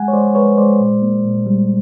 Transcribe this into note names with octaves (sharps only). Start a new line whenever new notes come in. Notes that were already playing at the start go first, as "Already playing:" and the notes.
Already playing: G#3 F#5 G#5
C#5
G#3 C5 D5
G#3 B4 C#5
G#3 C5 D5
A#2
A#3
A#2
G3